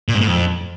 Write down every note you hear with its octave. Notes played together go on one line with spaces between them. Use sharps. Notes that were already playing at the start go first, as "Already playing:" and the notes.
A#2
G#2
A2
F2